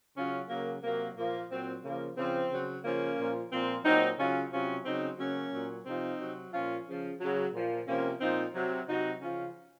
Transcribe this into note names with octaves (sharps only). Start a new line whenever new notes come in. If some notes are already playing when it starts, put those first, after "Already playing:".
C#3 F#3 C#4 F4
C#3 F#3 A#3
C3 F#3 A#3
A#2 F3 A#3
A#2 F#3 C4
C#3 F3 A#3
C#3 F3 C4
C#3 F#3
C#3 F3 A#3 C#4
A#2 F3
A#2 F3 C4
A#2 F#3 C4 D#4
C#3 F#3 C#4 F4
C3 F#3 C#4 F4
C#3 F#3 C4 D#4
C#3 F#3 A#3 C#4
A#2 F#3
C3 F3 C4 D#4
C3 F#3
A#2 F3 C#4 F4
C#3 F3
C#3 F#3
A#2 F3
C3 F3 A#3 C#4
A#2 F3 C4 D#4
C3 F#3
C3 F#3 D#4 F#4
C#3 F3 C#4 F4